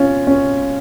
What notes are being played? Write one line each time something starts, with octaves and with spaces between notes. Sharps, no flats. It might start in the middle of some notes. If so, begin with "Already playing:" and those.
Already playing: C#4 F4
C#4